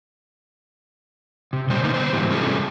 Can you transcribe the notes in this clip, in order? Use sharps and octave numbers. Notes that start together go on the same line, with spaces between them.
C3
A#2 G3 C5
D3 A#3 B3 D#4
B3 C5
G#2 E3 G3
C3 G3 C#4 F4 G#4 A4